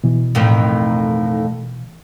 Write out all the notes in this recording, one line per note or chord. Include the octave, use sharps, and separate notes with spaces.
B2 E3
F2 A2 D#3